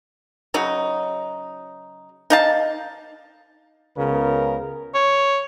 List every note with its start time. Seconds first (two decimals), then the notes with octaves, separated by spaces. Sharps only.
0.54 C#3 F#3 D#4
2.30 D#4 F5 A5
3.97 C#2 C#3 B3 A#4
4.95 C#5